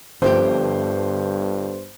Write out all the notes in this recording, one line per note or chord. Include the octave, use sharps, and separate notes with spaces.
G1 G2 F3 A3 C4 G4 C5